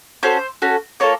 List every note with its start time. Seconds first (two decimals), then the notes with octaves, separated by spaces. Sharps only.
0.23 C#4 F#4 A4 C5
0.62 C#4 F#4 A4
1.00 A#3 F4 A4 C#5